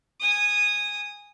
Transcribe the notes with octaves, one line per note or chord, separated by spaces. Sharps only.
G#5 D#6